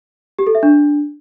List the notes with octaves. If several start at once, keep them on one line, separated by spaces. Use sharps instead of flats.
G4
A4
E5
D4